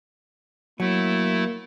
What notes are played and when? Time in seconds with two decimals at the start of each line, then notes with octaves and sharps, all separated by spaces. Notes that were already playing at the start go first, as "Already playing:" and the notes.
0.80 F#3 A3 A#3 E4